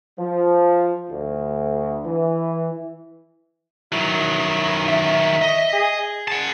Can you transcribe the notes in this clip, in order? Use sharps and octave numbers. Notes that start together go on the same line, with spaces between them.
F3
D2
E3
D#3 F#3 E4
E5
D#5
G#4
F#5 A5